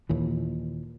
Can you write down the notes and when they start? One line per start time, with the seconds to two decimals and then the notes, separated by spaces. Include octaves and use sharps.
0.09 D#2 A#2 E3